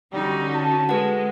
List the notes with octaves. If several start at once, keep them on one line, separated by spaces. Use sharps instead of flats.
D3 G3 C#4 D#4 F#4
A5
G#3 A4 B4 F#5